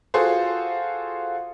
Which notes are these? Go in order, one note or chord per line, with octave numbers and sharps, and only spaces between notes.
F4 F#4 G#4 A4 C5